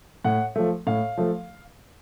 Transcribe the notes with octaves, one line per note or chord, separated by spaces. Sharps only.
A2 F#5
F3 A3
A2 F5
F3 A3